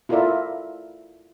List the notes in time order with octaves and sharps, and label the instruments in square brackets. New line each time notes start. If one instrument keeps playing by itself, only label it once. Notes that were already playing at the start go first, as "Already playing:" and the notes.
[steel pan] E4 F4 A4 A#4 D5 E5